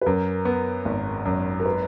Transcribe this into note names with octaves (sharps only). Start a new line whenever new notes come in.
B4
F#2 A#4
B3
G#1
F#2
A#4
B4